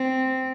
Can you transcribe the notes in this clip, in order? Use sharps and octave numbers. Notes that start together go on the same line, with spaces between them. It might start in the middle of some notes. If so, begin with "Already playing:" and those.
Already playing: C4